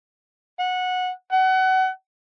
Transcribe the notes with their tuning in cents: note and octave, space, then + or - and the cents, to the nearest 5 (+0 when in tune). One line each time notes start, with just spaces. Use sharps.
F#5 -15
F#5 +30